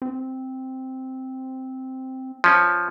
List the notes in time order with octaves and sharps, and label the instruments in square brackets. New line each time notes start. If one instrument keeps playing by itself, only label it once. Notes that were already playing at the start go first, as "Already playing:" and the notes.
[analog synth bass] C4
[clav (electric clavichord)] F3 C#4